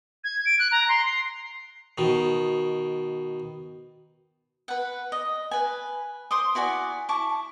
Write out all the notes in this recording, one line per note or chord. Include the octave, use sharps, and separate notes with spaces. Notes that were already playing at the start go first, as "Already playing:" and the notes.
G#6
D7
F#6
A#5
C6
C7
B2 D#3
B4 F#5
D#5
B4 G#5
C5 C6 D6 D#6
E4 F#4 D5 G#5
E4 A5 C#6 D6